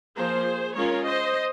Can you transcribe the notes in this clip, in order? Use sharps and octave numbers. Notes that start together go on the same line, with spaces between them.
F3 A#3 F4 G#4 C5
G#3 C#4 F4 A#4 C#5
C5 D#5